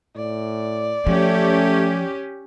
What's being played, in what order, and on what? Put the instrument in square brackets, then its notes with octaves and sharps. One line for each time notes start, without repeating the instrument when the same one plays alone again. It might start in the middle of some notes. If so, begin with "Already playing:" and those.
[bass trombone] A2 [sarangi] D5
[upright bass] F3 [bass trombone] A3 [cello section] C#4 G4